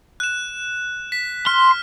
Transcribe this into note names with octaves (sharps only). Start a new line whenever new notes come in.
F#6 E7
B6
C6 F6